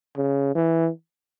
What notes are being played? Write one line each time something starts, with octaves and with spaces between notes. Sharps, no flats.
C#3
E3